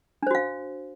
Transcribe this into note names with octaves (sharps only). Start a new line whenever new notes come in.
D4 F#4 C5 F5